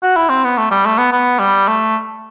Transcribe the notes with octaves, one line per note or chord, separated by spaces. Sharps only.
F#4
E4
C4
B3
A3
G3
A3
B3
B3
G3
A3